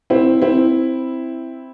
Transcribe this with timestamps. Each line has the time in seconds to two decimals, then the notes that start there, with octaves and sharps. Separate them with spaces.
0.10 C4 E4
0.42 C4 E4